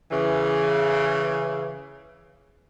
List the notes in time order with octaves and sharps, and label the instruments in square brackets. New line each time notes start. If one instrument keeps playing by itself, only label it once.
[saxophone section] C#3 E3